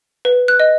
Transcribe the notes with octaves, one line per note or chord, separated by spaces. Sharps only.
B4
F#6
D#5